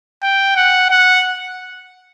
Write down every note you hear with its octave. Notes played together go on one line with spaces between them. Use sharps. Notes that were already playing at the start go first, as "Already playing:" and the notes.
G5
F#5
F#5